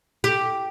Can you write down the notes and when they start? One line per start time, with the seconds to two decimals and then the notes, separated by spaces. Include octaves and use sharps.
0.24 G4